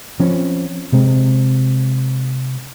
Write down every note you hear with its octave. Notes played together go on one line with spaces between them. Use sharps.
F3 C4 C#4
C3 G#3 C4